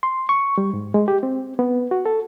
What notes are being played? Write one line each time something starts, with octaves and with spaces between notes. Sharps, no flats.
C6
C#6
G3
G#2
G#3
G4
C4
B3
F#4
A4